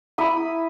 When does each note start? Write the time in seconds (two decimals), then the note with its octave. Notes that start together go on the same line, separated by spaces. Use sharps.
0.18 E4 B5 D#6